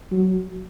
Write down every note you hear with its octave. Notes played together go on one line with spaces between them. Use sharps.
F#3